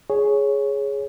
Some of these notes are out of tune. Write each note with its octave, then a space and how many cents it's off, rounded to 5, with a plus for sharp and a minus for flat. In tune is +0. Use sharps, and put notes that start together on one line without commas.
G#4 +5 C#5 +0